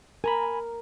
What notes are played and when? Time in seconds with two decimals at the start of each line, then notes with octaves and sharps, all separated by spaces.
0.24 A#4 G#5 A#5 B5